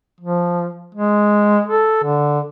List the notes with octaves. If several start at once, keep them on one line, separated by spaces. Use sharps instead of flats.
F3
G#3
A4
D3